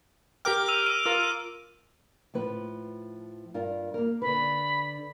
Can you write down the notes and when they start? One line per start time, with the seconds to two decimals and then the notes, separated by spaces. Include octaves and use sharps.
0.45 G4 A#4 G5 D6 F6
0.68 E6 D#7 F7
0.86 E6 D#7
1.06 F4 A#4 E6
2.34 A2 F3 B4
3.54 G2 F4 A#4
3.94 A#3 A#4
4.22 D3 B4 B5